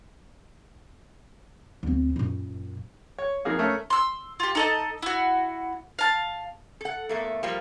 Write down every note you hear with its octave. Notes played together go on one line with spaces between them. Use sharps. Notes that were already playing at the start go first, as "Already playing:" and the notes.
D2 C4
F#2 A#2
C#5
F2 A#3 D#4 G#4 F5
A3 C#4 A#4
C6 E6
F4 G4
D#4 A4 D#5
E4 F#4
F5 A5
A4 F#5
E2 A3 A#3
F3 G3 A#3